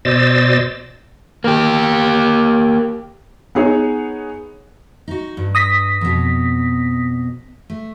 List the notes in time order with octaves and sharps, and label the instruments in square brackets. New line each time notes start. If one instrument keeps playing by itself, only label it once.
[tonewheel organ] B2 C5 D5 D#5 E6 A6
[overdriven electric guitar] A#3 G4
[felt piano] B3 D#4 G#4 C#5
[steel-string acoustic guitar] D#4 F#4
G2
[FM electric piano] D#6 A#6 B6
[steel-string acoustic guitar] F2 B2
A3